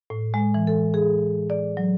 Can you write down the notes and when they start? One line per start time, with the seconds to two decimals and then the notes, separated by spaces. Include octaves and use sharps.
0.10 A2
0.34 G#3
0.54 E3
0.67 A4
0.94 G#4
1.50 D5
1.77 F#3